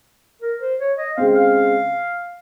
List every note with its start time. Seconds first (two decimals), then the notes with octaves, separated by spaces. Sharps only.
0.42 A#4
0.61 C5
0.80 C#5
0.98 D#5
1.17 C#3 G#3 C4 F5
1.35 F5